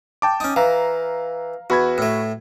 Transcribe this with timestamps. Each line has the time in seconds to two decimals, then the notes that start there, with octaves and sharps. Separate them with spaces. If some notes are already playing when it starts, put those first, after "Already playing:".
0.22 G5 A5 D6
0.40 C#4 D#4
0.56 E3 F5 A#5
1.70 E2 F#4 B5 G#6
1.98 A2 A3